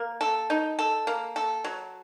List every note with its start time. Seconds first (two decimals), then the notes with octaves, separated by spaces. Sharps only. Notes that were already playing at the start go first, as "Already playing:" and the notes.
Already playing: A#3
0.21 A4
0.50 D#4
0.79 A4
1.07 A#3
1.36 A4
1.64 F#3